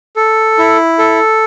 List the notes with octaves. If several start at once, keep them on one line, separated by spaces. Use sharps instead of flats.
A4
E4
A4